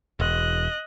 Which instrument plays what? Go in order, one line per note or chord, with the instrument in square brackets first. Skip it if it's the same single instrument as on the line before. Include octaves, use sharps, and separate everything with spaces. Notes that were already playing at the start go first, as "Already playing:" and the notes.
[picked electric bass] E1 [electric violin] D#5 F#6